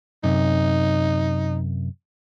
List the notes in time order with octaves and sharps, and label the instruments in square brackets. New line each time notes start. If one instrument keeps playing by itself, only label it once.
[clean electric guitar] F#2 C3 [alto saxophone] D#4